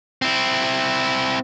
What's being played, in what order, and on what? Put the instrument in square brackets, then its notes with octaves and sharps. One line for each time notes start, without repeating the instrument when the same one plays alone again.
[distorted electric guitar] C4 E4